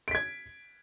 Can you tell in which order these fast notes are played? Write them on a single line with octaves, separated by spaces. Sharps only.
D7 B6 G#6